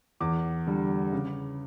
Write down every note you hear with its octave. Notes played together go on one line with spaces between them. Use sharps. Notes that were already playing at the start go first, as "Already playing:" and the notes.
E2 D6
D3 G3
C#3